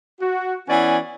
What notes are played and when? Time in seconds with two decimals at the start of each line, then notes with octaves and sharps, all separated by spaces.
0.20 F#4
0.69 E3 B3 C#4 D5 G#5